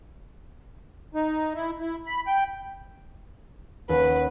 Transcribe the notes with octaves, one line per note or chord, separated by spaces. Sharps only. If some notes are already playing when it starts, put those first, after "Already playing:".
D#4
E4
E4
B5
G5
D#2 C#4 B4 F#5